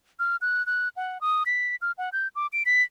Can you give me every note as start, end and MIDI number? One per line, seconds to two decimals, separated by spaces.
0.19 0.36 89
0.41 0.65 90
0.67 0.88 90
0.97 1.21 78
1.21 1.43 87
1.46 1.76 95
1.82 1.92 89
1.98 2.09 78
2.13 2.28 91
2.35 2.47 86
2.53 2.63 98
2.66 2.83 95